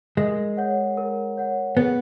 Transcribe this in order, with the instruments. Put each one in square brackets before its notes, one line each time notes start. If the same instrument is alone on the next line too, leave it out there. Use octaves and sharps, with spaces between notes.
[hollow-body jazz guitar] G#3 [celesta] A#4
[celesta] C#5 F#5
A#4
C#5 F#5
[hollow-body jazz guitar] B3 [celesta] G#4